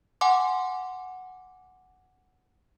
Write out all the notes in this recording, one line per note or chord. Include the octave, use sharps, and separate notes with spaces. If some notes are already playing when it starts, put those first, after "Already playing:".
F#5 G#5 C6 D6